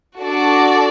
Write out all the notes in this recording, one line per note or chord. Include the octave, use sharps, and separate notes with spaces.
D4 F#4 A4 D5